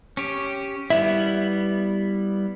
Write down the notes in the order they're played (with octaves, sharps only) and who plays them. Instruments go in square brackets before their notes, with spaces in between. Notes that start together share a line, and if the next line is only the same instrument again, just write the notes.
[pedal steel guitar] C#4 G4
[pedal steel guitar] G3 B3 E4 [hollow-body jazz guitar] E5